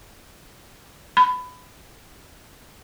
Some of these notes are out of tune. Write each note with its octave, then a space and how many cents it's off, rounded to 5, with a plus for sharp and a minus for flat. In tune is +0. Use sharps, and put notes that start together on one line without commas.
B5 +20